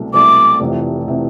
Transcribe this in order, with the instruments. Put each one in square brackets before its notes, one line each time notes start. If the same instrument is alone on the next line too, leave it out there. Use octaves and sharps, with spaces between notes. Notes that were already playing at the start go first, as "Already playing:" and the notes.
Already playing: [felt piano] C2 B2 F#3 A3
[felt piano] C2 B2 F#3 A3 [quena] D6
[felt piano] F1 F2 C3 E3
C3 E3